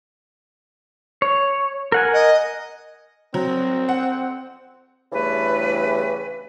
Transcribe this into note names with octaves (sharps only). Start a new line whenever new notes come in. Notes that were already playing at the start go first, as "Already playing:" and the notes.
C#5
A#4 F#5 G#5
D#5
F#3 C4
F#5
E2 G2 C#3 E3 A3 B4